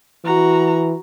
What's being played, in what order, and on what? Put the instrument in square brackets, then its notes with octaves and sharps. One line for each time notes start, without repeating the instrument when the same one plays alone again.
[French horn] E3 [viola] F#4 A#5